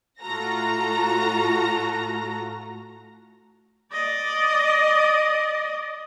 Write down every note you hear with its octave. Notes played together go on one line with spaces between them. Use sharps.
A2 F4 F#4 A4 A#5 A#6
D5 D#5